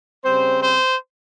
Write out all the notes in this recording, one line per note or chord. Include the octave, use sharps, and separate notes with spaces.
C#3 G3 C4 C5
C5